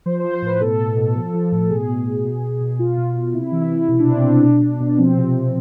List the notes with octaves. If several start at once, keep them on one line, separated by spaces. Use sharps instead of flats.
F3 C5
F3 C5
C5
A2 B4
B2 A4
B2
B2
F3
F3
A2
B2 G#4
B2
B2
B2
B2
B2
B2 F4
B2
B2
C3 E4
E3
E4
C3
B2 E4
D4
B2 C4
B2 D4
B2
B2
B2
D4
F3 C4
C3
C3